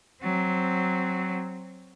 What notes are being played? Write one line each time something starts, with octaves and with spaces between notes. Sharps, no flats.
F#3 C4